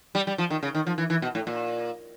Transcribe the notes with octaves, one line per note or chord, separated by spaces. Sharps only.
G3
G3
F3
D#3
C#3
D#3
F3
E3
E3
B2
A2
A#2